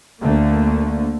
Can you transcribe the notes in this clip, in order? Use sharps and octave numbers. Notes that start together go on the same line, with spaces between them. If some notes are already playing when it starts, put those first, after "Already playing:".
D2 D3 A3 A#3